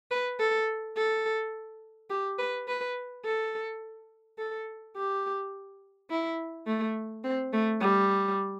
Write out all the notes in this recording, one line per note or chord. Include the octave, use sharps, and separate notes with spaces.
B4
A4
A4
G4
B4
B4
A4
A4
G4
E4
A3
C4
A3
G3